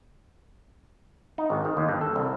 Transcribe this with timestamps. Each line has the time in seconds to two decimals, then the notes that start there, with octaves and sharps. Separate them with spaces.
1.38 D#4
1.50 G#1
1.65 D#3
1.77 D#2
1.89 G2
2.01 A4
2.16 C2